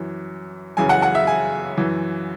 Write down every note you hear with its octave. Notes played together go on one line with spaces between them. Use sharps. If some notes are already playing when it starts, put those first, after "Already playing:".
Already playing: F#2 E3
F#2 C#3 E3 G#5
F#5
F#5
E5
G#5
F#2 E3